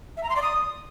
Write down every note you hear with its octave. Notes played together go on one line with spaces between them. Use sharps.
E5
A#5
C6
D5
D#6